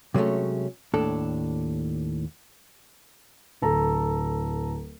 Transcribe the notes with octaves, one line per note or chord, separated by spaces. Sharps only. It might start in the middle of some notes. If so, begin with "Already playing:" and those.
C3 F#3 G#3 A3 C#4
D#2 A2 D4 A4
D1 A4 A#5